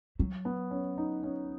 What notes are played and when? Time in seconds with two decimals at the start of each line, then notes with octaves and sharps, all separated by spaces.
0.19 F#3
0.45 B3
0.71 C#4
0.98 D#4
1.23 C#4